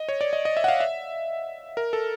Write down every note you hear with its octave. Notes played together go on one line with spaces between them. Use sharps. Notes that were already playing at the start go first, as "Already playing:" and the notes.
Already playing: D#5
C#5
D5
D#5
D#5
E5
F#5
F5
E5
A#4
A4